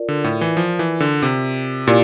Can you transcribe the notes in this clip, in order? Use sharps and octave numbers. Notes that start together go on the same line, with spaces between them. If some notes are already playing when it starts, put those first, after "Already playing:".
Already playing: F4 A#4 D5
D3
A2
E3
F3
E3
D3
C3
A#2 E4 G4 D5 F5